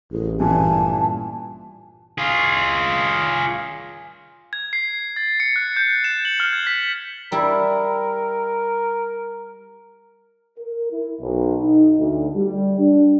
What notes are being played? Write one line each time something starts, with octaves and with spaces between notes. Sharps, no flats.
A1 G#4
G2 A#2 E3 G#5 A5
F4 G#4
G#6
C7
A6
C#7
F#6
G6
E7
F#7
F6
G#6
B6
G3 E4 A#4
A#4
E4
B1
D#4
D2
G3
D4